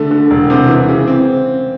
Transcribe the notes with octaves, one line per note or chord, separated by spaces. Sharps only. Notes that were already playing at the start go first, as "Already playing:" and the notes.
Already playing: D3 A3
D3
E1
C3
E3
C#3
C4